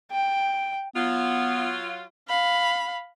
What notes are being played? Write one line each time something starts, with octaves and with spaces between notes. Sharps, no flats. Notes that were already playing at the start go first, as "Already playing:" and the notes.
G5
F#3 B3 F4
F5 B5